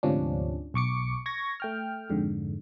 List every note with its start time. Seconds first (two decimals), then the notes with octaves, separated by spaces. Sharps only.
0.03 D2 G#2 C3 F3 C#4 D4
0.74 B1 C#6 D6 C#7
1.26 C#6 G#6 A#6
1.60 A3 G5 F6
2.09 F2 G#2 D3